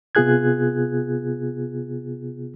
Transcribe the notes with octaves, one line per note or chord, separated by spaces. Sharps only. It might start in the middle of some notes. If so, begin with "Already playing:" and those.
C3 B3 F4 G#4 F#6 G#6